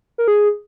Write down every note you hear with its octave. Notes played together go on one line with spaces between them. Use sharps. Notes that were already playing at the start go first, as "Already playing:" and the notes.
A#4
G#4